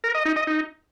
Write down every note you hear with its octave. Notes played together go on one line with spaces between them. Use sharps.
A#4
D#5
D#4
D#5
D#4